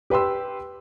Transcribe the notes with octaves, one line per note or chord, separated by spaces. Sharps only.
G4 B4 G5 C6 E6